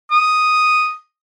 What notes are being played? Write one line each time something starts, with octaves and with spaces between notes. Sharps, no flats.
D#6